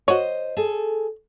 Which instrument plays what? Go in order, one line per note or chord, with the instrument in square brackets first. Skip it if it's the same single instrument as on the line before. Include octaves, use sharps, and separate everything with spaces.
[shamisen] F#4 C#5 [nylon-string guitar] C5 D#5
[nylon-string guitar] G#4 A4